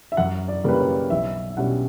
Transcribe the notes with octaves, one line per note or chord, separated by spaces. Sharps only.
E5
F#2 F#5
D5
C#3 G3 A#3 B4
C#5
B1 E5
E5
B2 G3 C#4 F#5